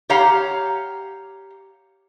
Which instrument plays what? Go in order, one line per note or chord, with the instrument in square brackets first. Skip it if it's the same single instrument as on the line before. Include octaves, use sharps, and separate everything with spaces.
[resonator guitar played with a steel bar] G4 C#5 F5 F#5 A#5